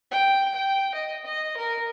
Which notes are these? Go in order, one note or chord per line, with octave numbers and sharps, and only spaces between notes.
G5
G5
D#5
D#5
A#4